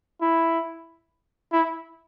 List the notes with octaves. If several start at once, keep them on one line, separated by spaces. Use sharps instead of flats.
E4
E4